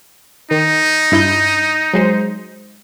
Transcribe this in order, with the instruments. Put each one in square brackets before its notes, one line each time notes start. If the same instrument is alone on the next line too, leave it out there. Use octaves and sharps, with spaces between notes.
[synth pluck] D#3 [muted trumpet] D#4
[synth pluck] G2 E4 G6
F#3 G#3 C5